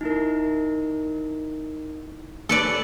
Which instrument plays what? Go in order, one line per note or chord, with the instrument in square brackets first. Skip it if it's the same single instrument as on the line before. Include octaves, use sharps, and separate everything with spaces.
[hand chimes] D#4 E4 A#4
[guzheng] A4 B4 D5